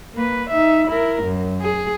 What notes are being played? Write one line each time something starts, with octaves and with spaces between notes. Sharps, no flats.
A#3 B4
D#4 E5
E4 A#4
F#2
G#4